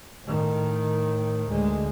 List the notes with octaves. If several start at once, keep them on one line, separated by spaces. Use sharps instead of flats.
A2 D#3
D2 G#3